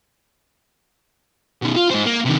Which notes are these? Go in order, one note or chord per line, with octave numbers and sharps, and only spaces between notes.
B2 D#3
F4
G#2 C5
A#3
C3 D#3